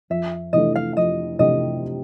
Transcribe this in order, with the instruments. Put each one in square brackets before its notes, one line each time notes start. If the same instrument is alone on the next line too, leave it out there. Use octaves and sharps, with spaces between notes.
[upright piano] F2 [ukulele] E5
[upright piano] C3 E3 A3 D4 [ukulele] D#5
[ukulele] F5
[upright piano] F2 [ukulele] D#5
[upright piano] C3 E3 A3 D4 [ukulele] D#5